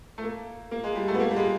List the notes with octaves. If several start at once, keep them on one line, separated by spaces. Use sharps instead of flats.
A3
A#3
A#3
G#3
G3
A3
B3
A#3
G3
G#3